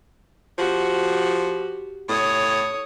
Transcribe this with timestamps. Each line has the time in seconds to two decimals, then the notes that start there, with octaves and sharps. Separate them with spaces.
0.58 F3 F#4 G4
2.09 A2 C#5 D#6